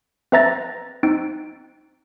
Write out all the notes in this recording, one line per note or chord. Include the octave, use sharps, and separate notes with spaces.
C4 B4 E5 A#5 A6 A#6
C4 D#4 D7